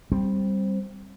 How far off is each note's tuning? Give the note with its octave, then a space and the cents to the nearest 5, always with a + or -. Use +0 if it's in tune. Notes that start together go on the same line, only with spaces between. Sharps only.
G3 +0 C4 +10